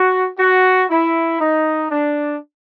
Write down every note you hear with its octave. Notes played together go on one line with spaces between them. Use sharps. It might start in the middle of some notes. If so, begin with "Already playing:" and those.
Already playing: F#4
F#4
E4
D#4
D4